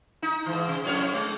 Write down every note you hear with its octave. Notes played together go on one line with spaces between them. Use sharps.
D#4
G#2 E3
C3
F2 A2 C#5
G#3